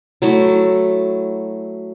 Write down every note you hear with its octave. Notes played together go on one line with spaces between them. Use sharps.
F#3 A3 E4